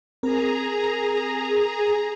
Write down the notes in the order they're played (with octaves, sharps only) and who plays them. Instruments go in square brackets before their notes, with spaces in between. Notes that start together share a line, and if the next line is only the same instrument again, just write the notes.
[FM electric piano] C4 A#4 [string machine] G#4 A#5